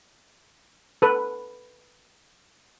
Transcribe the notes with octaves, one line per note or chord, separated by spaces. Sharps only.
A4 B4